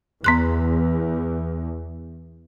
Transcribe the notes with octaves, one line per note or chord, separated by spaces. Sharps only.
E2 B3 C6 F#6